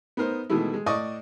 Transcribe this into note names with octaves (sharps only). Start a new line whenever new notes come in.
B3 D#4 A#4 C5
B2 D#3 E3 G#3 A3 E4
G#3
A2 D5 D#5 C#6 D#6